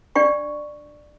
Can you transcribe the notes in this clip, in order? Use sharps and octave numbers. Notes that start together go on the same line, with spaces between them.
D4 D5 G5 C#6